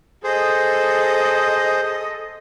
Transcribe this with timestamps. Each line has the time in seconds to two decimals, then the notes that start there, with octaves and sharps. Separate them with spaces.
0.24 G#4 A4 C5 D#5